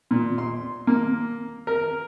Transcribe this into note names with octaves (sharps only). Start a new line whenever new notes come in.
A#2
C6
A#3
A#4